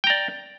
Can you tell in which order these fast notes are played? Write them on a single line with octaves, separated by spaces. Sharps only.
G5 A#5 D5